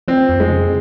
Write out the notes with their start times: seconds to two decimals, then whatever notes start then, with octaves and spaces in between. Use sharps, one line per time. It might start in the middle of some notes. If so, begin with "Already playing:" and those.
0.08 F3 C4
0.29 F2
0.40 G#3
0.50 C#3